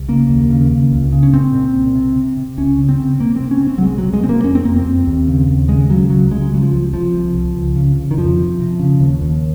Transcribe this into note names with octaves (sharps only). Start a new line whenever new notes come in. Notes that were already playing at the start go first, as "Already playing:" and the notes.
Already playing: C2
C#3 A#3
D#2
C#3
C#3
C#2
C#3
C#4
A#2 C4
A#2
C2
C3
C3
C3
C#2 C#4
C#3
C4
C#3
C3 A#3
C3 C4
C#4
C3
C4
F#3
C2 G#3
C3 F#3
G#3
C3 C4
A#3
F2 C#4
C4
F2 A#3
C4
F2
D#2
C#3
D#2
C#3 G#3
C#3 F#3
C#2 F#3
C#3 G#3
C#3 F#3
F3
C#2
C3 F3
C2
C2
C#2
C#3
C#3
D#3
F2 F3
C3
C3
C#3
D#2
D#2